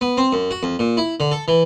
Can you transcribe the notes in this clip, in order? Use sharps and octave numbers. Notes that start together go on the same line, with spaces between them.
B3
C4
F#2
F#4
F2
A#2
E4
D3
A4
E3